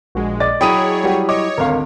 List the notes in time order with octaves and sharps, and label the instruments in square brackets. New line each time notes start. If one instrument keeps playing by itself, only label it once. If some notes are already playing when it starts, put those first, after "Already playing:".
[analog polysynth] A#1 G#3 [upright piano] F#4
[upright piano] D5 D#5 D6 [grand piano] A6
[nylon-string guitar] F#3 E4 G5 [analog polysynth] G#4 C#5 [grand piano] B5 D#6 D#7
[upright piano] G3 F#4 G4
[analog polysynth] C#5 [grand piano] D#5 D6
[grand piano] G#1 D2 [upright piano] A#4 F5